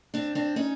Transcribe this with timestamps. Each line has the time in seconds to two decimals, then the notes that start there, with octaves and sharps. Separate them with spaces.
0.14 C4 D4
0.35 C4 D4
0.56 C#4 D#4